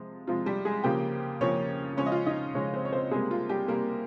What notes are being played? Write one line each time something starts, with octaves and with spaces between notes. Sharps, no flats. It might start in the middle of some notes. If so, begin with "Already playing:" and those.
Already playing: C3 F3 G#3
C3 F3 G#3 F4
G3 G4
G#3 G#4
C#3 F3 A#3 G4 G5
C#3 F3 A#3 C#4 C#5
C#3 F3 G#3 C#4 C#5
D#5
F4 F5
D#4 D#5
C#3 F3 G#3 C#4 C#5
C4 C5
C#5
C4 C5
C3 G3 G#3 A#3 G#4
F4
G3 G4
C3 G3 A#3 A#4